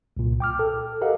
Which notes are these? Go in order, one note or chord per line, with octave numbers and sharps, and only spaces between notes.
C2 A#2
G5 D6 F6
A4
G4 A4 A#4 D#5 F5 F#5